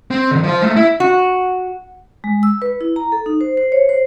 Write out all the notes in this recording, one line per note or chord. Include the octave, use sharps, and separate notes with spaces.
C4
D3 D#3
F3 C5
A3 A#3
E4
F#4
G#3
E6
B4
E4
A#5
A4
D#4
C5
C5
C#5
C5